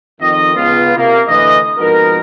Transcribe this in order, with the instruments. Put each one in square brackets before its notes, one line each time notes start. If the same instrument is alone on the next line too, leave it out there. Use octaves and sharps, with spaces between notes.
[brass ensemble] F2 D#3 D#5
C#2 B3 F4
C3 A#3
A2 D3 E3 B4 D#5
F2 G#2 B2 B3 A#4